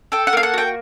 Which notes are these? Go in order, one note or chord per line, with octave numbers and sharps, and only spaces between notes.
A4 G5
F#5
A#3 F5
F#5
F#4 G5